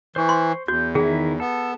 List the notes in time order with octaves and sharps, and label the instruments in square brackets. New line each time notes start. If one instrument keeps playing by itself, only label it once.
[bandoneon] E3 [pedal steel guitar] C5 C#6
[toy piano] C6
[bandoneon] E2 [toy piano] F#4 [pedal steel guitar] G6
[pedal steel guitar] D#3 E4 [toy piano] G#4
[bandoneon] B3 [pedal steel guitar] A4